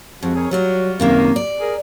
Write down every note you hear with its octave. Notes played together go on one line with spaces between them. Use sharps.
F2 F3 G#3 F#4
G#4 A#4 C#5
F#3 G3 F4 F#4
F#2 C3 D#3 A#3
D5
G#4 A#4